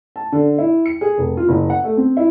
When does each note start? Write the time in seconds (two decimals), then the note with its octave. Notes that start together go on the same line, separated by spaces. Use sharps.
0.16 A5
0.32 D3
0.58 E4
0.86 C#7
1.01 G#4
1.18 F1
1.37 F4
1.49 F#1
1.70 F#5
1.84 A3
1.97 C4
2.17 E4